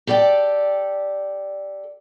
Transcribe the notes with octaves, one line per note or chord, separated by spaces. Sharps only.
G4 A4 D5 F5 G5